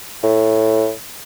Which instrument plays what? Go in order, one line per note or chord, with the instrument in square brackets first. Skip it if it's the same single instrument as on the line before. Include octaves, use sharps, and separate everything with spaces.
[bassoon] A2